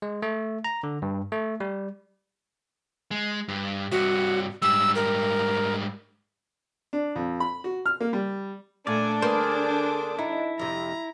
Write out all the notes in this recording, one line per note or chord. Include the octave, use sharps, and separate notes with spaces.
G#3
A3
A#5
D3
G2
A3
G3
G#3
G2
G2 C3 F#4
G#2 G3 E6
A#4
D4
F2
B5
F#4
F6
A#3
G3
A#2 A3 D4 D5 G#5
D3 A#3 G#4 B4 C5 D6
D#4 E4
F2 C3 A#5